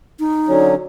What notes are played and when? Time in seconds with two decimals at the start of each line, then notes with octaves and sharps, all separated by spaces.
0.19 D#4
0.48 D3 F#3 C#4